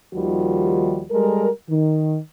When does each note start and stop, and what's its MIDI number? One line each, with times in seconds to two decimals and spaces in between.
0.14 1.04 39
0.14 1.04 51
0.14 1.04 53
0.14 1.04 55
0.14 1.04 66
1.10 1.48 55
1.10 1.48 56
1.10 1.48 69
1.10 1.48 70
1.69 2.17 51